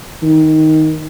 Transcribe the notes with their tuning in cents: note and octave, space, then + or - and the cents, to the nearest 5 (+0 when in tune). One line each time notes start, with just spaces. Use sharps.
D#3 +10